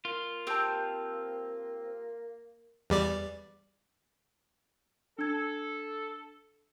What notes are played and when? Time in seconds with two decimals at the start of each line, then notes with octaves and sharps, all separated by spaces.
0.05 A#3 F4
0.47 C4 G4 A5
2.90 E2 G3 D5
5.19 D4 A4 G#6